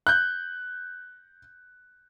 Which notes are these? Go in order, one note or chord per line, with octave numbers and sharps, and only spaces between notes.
F#6 G6